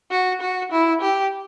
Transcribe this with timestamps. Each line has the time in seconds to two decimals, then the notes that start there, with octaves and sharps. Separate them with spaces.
0.11 F#4
0.41 F#4
0.72 E4
1.01 G4